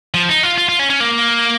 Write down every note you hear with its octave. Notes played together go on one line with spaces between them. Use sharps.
F3
D#4
F4
F4
F4
C#4
C#4
A#3